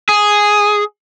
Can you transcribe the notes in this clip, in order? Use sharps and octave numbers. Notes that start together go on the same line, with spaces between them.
G#4